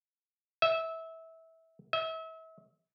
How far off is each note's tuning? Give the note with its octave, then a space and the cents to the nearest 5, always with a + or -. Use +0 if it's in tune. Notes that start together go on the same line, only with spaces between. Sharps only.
E5 -20
E5 -35